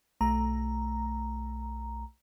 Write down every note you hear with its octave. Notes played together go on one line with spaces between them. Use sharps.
B1 A3 A#5